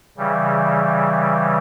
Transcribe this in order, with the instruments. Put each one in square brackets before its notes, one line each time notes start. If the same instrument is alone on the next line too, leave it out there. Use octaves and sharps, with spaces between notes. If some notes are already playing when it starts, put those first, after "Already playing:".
[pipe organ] C#3 E3 G3